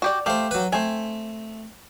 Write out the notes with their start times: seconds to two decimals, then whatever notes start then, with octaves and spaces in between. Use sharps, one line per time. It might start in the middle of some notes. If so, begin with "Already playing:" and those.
0.02 F#4 G4 D5
0.26 A3 G4 C5 F5
0.51 F#3 B4
0.73 A3 C4 G#5